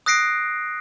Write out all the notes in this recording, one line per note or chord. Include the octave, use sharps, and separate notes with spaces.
D#6 F#6 A#6 C7 D7